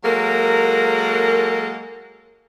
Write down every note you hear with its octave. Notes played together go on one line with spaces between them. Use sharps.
F#3 G#3 A#3 A4 A#4